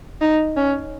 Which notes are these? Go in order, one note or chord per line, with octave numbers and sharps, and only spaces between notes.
D#4
C#4